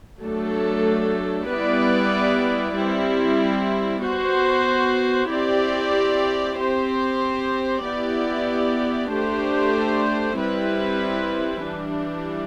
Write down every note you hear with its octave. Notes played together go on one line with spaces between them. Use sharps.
F#3 A3 D4 A4
G3 B3 E4 B4 D5
G3 C4 E4
B3 F#4 C5
C4 E4 G4 D5
C4 G4 C5
B3 E4 G4 D5
A3 D4 G4 C5
G3 C4 E4 B4
E3 G3 D4